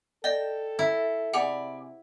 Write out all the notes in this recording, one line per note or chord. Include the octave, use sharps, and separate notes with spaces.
A4 D5 D#5 G5
E4
C3 G#4 D5 F#5 G#5 B5